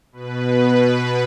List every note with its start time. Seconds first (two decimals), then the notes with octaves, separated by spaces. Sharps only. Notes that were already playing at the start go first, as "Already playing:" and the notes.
0.12 B2 B4